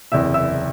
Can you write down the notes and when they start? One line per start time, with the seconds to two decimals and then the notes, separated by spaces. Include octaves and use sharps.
0.12 F#1 E2 C3 E5 E6
0.34 E5 E6